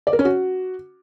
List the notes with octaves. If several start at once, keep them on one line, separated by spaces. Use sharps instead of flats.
D5
A#4
C#4
F#4